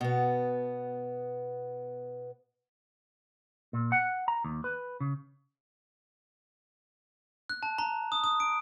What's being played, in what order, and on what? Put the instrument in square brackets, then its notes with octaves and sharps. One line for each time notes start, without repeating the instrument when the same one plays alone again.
[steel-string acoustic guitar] B2 B3
[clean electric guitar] A#2
F#5
A#5
D#2
B4
C#3
[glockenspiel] F#6
A5
A#5
D#6
D#6
D7